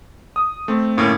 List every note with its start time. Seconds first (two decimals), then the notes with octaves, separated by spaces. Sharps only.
0.36 D#6
0.68 A3 C4
0.97 G1 A2 A#3 C#4